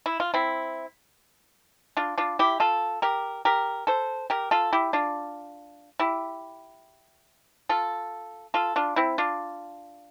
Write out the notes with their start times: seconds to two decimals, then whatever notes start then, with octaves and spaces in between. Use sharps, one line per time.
0.06 E4
0.20 F4
0.34 C4 E4
1.97 D4 F4
2.18 D4 F4
2.39 E4 G4
2.60 F4 A4
3.02 G4 A#4
3.45 G4 A#4
3.87 A4 C5
4.30 G4 A#4
4.51 F4 A4
4.73 E4 G4
4.93 D4 F4
6.00 E4 G4
7.69 F4 A4
8.54 F4 A4
8.76 D4 F4
8.96 C4 E4
9.18 D4 F4